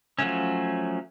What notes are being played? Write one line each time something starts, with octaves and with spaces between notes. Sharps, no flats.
F3 F#3 A3 C#4